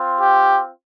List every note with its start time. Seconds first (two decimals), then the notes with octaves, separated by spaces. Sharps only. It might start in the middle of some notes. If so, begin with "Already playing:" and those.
Already playing: C4 F4
0.18 G4